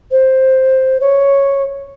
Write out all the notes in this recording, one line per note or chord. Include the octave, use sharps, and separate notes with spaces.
C5
C#5